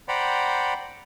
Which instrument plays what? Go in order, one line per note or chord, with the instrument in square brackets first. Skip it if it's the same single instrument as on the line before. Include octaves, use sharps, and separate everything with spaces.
[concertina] C5 D5 F#5 G5 A#5 B5